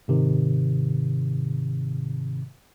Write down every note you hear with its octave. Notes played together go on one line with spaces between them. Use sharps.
G#2 C3 D#3